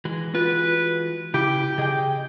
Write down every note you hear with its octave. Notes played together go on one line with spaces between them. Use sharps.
E3 G#3 F#4
F4 B4
C#3 E4 G4
C#3 G#4 D#5 G5